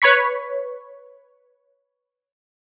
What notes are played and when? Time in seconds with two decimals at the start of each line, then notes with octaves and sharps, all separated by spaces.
0.02 B4 C#5 B5 C#6 B6